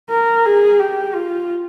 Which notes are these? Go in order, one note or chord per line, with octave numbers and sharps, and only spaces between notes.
A#4
G#4
G4
F4